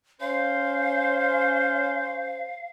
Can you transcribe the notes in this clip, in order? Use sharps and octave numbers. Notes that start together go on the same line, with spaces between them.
C#4 C5 F5